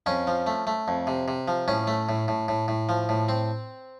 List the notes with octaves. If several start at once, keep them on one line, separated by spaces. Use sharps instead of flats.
F2 C#4
F3
A3
A3
F2
C3
C3
F3
A2 C#4
A3
A2
A2
A2
A2
F3
A2
C4